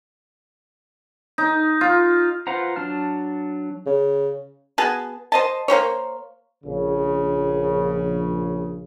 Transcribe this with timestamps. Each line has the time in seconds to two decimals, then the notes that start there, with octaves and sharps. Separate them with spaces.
1.38 D#4
1.81 F4
2.47 F4 B4 C5 F#5 A#5
2.76 F#3 D4 A5 F6
3.86 C#3
4.78 B3 F#4 G#4 A5
5.32 C5 D#5 A5
5.68 A#3 F#4 C5 C#5
6.64 A#1 C#3